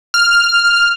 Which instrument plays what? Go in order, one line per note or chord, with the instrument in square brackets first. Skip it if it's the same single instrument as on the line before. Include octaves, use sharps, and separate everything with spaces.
[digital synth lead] F6